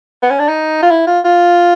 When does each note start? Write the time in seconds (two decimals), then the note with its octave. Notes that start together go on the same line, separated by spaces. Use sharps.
0.23 B3
0.31 C#4
0.39 D4
0.48 D#4
0.83 F4
0.91 E4
1.07 F4
1.25 F4